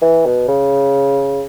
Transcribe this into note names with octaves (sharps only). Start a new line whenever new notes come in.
E3
B2
C#3